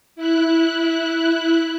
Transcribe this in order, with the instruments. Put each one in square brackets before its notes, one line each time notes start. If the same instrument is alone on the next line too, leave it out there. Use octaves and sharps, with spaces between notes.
[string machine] E4 F#6